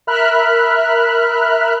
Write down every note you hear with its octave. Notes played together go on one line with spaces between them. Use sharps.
A#4 E5 B5 F6 F#6